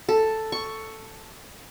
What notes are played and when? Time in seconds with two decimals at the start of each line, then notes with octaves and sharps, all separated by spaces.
0.09 A4
0.52 C#6